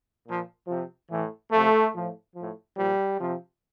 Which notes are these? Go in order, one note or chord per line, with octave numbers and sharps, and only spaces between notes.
A#2 F3
C3 F3
A2 E3
C3 F3 A3
A2 F3
A2 F3
A#2 F3 G3
C3 F3